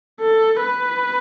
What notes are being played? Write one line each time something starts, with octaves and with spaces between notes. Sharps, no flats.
A4
B4